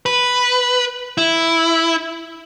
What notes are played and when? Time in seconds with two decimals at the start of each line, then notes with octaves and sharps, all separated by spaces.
0.06 B4
1.18 E4